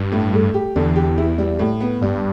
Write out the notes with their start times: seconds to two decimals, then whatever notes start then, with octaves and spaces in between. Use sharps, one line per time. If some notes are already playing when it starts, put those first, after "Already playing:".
Already playing: G2
0.12 A2
0.33 A3
0.54 G4
0.76 E2 D3
0.96 G4
1.18 E4
1.38 G3
1.59 A2
1.81 B3
2.01 G2 G3